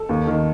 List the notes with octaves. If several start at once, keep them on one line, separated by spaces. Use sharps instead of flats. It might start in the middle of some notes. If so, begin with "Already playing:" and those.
Already playing: A4
D#2
D#3